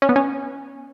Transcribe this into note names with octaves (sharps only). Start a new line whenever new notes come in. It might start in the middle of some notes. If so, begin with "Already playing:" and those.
C#4
B3
C#4